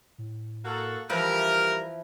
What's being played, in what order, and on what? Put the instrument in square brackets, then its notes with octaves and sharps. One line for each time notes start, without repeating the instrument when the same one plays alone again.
[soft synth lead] A2
[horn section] A#3 F#4 A4
[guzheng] E3 F3 E4 [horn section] G3 A#4 [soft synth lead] E5